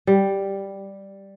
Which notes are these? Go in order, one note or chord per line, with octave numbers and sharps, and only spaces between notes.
G3